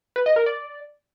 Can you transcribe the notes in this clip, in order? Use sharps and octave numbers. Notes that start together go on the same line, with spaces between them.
B4
D#5
A#4
D5